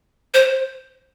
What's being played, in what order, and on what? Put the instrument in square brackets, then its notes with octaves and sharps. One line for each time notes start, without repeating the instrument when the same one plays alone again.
[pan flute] C5